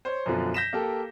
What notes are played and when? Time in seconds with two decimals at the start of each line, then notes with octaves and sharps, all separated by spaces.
0.05 C5 C#5
0.26 F#2 B2 D3 F3
0.54 G6 A#6 B6 E7
0.73 A#3 G4 A4